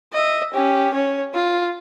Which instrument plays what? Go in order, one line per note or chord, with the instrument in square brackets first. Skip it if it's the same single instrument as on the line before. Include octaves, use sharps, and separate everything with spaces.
[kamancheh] D#5 E5
C#4 G4
C#4 C#5
F4